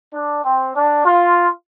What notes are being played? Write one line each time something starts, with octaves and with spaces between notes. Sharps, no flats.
D4
C4
D4
F4